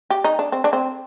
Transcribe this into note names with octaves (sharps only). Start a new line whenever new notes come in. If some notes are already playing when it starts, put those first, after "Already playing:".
G4
D#4
D4
C4
D4
C4